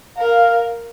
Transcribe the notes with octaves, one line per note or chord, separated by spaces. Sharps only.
A#4 F5